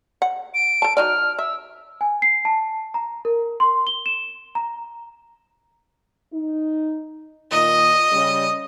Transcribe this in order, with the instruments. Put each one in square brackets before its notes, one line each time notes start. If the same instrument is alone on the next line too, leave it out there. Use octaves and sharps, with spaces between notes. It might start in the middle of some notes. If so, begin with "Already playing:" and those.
[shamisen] F#5
[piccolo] D7
[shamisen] A4 A5
[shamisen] F#3 D#4 D5 [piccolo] F6
[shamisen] E5 [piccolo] E6
[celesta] G#5
C7
A5
A#5
A#4
C6
G7
E7
A#5
[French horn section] D#4
[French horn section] A#2 D#3 [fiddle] D#5
[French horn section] C#3 G3